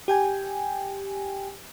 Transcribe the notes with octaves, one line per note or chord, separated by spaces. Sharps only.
G4 G5 G#5